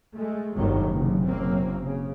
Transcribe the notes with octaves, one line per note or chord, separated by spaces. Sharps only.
G#3 A3
G1 F2 D#3 F#3 G#3
F#1 C3
F#1 A#3 C4
C#3